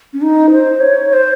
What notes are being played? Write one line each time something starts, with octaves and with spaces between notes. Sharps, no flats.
C#4
D#4
C5
C#5
C#5
C5